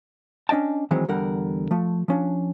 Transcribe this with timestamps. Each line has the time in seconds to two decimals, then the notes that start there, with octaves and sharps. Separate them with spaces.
0.49 C#4 D4 D#5 G5 A5
0.91 D#3 E3 F#3 G#3 C4
1.08 E2 D3 G3 A#4 F#5
1.71 F3 A3
2.08 F3 C#4 D4